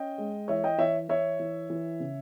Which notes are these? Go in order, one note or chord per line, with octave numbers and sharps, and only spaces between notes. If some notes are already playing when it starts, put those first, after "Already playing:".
Already playing: C#4 D#5 G5
G#3
E3 C#5 E5
D#5 G5
E3 C#5 E5
E3 C#5 E5
E3
E3
C#3